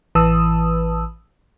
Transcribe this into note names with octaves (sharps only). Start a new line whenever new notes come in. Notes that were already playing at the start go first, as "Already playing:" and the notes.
A1 E3 B4 A5 D#6 E6